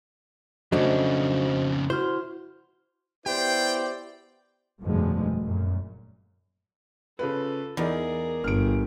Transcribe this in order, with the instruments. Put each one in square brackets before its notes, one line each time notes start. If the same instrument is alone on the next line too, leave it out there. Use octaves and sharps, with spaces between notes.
[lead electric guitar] F2 C#3 [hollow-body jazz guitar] F#3 A3 D4 [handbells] F#4 C5 D#5
[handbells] E4 F#4 F6 [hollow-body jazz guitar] C5
[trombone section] B3 E4 [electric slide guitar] G4 [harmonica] C5 D5 [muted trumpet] G5
[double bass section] F1 G2 B2 D3 F3 G#3
F#2 A#2
[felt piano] C#3 F4 B4 [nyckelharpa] A4
[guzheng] E2 [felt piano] D#4 D5 [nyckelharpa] G#4 A#4
[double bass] G1 [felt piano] F6 D7